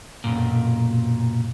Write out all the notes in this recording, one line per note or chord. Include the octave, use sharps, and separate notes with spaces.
B1 F#2 A#2